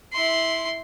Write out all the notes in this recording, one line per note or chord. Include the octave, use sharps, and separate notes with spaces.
E4 C6